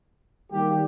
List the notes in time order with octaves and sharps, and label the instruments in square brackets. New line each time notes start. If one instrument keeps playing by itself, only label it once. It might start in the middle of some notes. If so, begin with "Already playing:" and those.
[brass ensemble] D#3 G3 A#3 G4